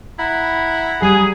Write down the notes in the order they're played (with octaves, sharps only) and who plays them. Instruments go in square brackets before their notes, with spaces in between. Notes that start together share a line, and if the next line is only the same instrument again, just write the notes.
[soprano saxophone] E4 [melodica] F#5 A#5 B5
[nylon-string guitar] G3 [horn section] G#4